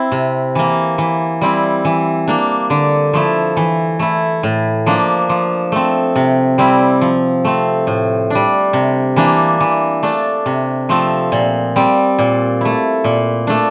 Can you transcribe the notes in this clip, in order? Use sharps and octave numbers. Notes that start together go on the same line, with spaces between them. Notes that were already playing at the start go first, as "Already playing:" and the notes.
Already playing: C4 E4
C3
E3 A#3
E3
G3 C4 E4
E3
A#3 D4
D3
F3 A3 E4
E3
A3 E4
A2
F3 A#3 D4
F3
A3 C4
C3
G3 C4 E4
F3
A3 C4
A2
G3 D4
C3
E3 A#3 D4
E3
A3 D4
C3
F3 A3 C4
A#2
G3 C4
A#2
A3 E4
A#2
A3 D4